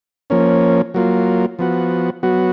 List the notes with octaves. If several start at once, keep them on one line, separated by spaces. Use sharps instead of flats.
F3 A#3 C#4
F#3 A#3 F4
F3 B3 F#4
F#3 B3 F#4